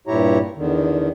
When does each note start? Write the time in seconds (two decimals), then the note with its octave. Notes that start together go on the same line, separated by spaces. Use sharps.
0.07 G2 A#2 E4 G4 C#5 A#5
0.57 E2 D3 D#3